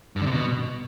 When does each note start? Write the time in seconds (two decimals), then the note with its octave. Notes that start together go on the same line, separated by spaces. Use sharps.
0.16 G2
0.21 D3
0.26 C3
0.32 B2